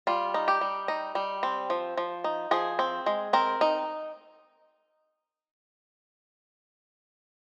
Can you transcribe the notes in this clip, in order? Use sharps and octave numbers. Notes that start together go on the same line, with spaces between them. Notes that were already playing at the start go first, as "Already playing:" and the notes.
G3 F4
D#4
G4
G3
D#4
G3
C4
F3
F3
D#4
F3 G#4
C4
G#3
C4 A#4
D#4